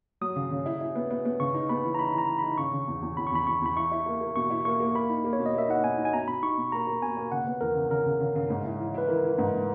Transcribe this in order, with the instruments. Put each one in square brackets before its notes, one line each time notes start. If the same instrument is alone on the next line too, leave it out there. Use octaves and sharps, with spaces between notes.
[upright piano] F#3 [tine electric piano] D#6
[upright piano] C#3
C#3
E4
E4
B3
B3
B3
[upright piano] C#3 [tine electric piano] C#6
[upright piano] D#4
[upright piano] B3 [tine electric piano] B5
[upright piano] E3
[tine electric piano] A#5
[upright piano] D#4 [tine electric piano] B5
[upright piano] E3 [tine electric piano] A#5
[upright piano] E3
[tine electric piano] B5
[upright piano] D#4
[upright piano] C#3 [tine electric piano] C#6
[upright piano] C#3
E2
E2
[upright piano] E2 [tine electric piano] B5
[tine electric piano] C#6
[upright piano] E2 [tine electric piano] B5
[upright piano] E2 [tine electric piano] C#6
[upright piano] E2 [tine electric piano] B5
[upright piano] E4 [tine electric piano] C#6
[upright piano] E4
A#3
A#3
[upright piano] B2 [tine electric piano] C#6
[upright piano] E4
[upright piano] A#3 [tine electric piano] C#6
[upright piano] A#3
[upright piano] A#3 [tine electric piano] B5
[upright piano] D#4
A#3
[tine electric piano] C#5
[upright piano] B2
[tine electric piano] D#5
[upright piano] A#3 [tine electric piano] E5
[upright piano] D#4 [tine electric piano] F#5
[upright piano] B2 [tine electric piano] G#5
[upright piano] D#4
[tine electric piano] G#5
[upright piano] B2 [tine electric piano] A#5
[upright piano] B2 [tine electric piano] B5
[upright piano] D#4 [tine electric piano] C#6
[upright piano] B2
[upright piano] A#3 [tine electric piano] A#5
[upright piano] A#3
[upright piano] B2 [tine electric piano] G#5
[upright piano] A#3
[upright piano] C#3 [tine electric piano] F#5
[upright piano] B3
[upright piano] E2 [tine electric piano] A#4
[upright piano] C#3
[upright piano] C#3 [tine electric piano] A#4
[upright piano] C#3
C#3
C#3
G#2
E4
E3
[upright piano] E4 [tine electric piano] B4
[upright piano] E3 [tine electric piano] A#4
[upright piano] E3
G#2